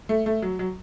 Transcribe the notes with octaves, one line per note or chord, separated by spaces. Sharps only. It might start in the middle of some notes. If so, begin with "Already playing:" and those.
A3
A3
F#3
F#3